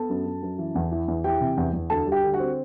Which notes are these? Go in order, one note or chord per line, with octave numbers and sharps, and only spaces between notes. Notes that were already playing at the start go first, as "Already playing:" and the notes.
Already playing: B3 A4 A5
F#2
F#2
F#2
E3
E2
E3
E2
E3 G4 G5
C3
E2
E2
D2 A4 A5
G3
G4 G5
D3
F#4 F#5
C4